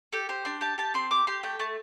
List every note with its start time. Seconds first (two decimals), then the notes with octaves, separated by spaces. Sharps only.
0.13 G4 A4
0.29 G4 C5
0.45 D4 C6
0.61 G4 A5
0.78 G4 A5
0.94 C4 C6
1.11 G4 D6
1.27 G4 C6
1.43 A3 G5
1.59 A3 A5